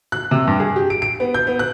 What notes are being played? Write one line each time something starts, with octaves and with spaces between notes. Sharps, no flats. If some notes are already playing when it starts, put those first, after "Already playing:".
F#6
C3
G2
G#4
G4
D7
D7
B3
G6
B3
F#6